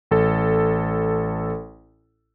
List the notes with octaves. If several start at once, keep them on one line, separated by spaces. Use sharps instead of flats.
A1 A4